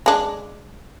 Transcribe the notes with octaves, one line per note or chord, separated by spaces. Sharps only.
G#3 D4